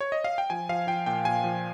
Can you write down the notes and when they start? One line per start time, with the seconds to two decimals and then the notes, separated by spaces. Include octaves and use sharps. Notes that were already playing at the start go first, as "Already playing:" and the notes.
0.00 C#5
0.12 D#5
0.24 F5
0.38 G5
0.50 F3 G#5
0.69 F3 F5
0.87 F3 G5
1.06 A#2 G5
1.25 A#2 G#5
1.44 F3